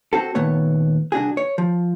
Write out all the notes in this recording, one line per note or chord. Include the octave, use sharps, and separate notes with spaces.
C4 F#4 A4
D#2 A#2 A3 B3 C#5
C2 D4 F#4 G#4
C#5
F3